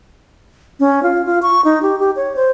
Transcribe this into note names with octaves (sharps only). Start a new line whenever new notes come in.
C#4
F4
F4
C#6
D#4
G4
G4
C#5
C5